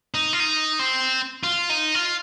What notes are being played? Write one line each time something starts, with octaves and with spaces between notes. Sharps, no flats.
D#4
F4
D#4
C4
F4
D#4
F4